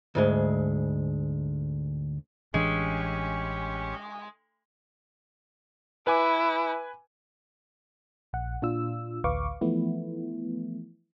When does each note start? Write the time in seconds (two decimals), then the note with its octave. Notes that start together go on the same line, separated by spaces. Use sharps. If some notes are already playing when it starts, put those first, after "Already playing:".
0.15 D2 G#2 G#3
2.54 A1 E3 G#3 C#4 D4 G4 C#6
6.07 E4 B4 G#5 D6
8.33 A#1 F#5
8.62 A#2 D4 F4 E6
9.24 A1 D2 B4 F5 C#6 D6
9.61 E3 F3 A3 B3 E4